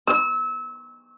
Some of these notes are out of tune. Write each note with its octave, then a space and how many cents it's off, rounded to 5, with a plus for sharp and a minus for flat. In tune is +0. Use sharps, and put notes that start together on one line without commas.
E6 -25